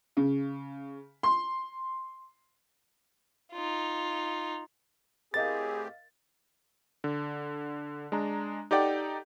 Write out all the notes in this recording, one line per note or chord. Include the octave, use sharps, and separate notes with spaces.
C#3
C6
D#4 F4
A2 C4 G4 G#4 A#4 D#5 F5 A6
D3
G#3 D4 A#5
D#4 G4 A4 D5 F#5 G5